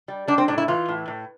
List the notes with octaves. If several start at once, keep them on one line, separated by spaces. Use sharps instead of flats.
G3
G3 D4
C4
A2 D4
E4
E3 F4
A2
A2